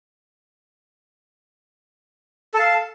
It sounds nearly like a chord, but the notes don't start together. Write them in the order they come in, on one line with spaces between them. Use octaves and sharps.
A4 A5 F5